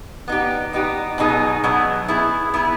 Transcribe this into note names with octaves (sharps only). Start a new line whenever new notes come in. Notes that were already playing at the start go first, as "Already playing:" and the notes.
B3 D#4 G4
B3 D#4 G4
B2 F#3 B3 D#4 G#4
B2 F#3 B3 D#4 G#4
B3 E4 G#4
B3 E4 G#4